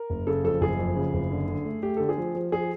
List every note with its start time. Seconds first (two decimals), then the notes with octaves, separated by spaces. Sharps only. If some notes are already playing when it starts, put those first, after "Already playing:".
Already playing: A#4
0.10 F#1
0.27 C#3 A4
0.44 F2 A4
0.61 F#1 G#4
0.79 F2
0.96 C#3
1.14 F#1
1.31 D3
1.48 D3
1.65 A3
1.82 A3 G4
1.97 D3 A4
2.09 G#4
2.18 F3
2.35 F3
2.52 F3 G#4